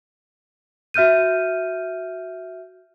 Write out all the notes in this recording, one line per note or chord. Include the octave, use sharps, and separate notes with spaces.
F#4 E5 F6 G6 D#7